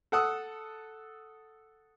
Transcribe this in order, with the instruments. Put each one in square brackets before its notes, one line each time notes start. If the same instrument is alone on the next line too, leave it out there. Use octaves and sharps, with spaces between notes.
[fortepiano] A4 F#5 D#6 E6